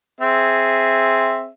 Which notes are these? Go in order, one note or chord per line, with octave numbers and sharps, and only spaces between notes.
C4 G#4 E5